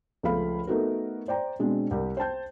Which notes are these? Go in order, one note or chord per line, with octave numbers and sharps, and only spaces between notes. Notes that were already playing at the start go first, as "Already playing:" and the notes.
C#2 F3 A3 A4 F5 B5
A3 B3 D#4 F#4 A4 A#4
C5 D5 G5 A#5
B2 G#3 C4 D4
C2 G4 A#4
C5 G5 A5 G6